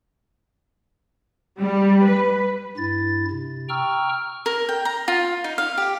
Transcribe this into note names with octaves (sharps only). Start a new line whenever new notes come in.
G3
B4
G2 E4 A6
C3
G5 A#5 C#6 E6 F6
A#4
G5
A#5
F4
D#4
F5
G4